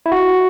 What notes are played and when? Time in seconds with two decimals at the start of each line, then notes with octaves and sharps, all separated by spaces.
0.06 E4
0.12 F#4